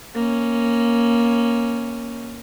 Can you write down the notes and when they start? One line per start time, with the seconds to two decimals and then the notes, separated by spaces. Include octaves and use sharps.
0.14 A#3 C#4